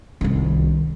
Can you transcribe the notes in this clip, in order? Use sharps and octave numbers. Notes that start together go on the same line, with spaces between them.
C2 D#3